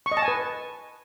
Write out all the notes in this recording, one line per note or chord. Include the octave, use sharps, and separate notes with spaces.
C#6
D#5
A5
G#5
B4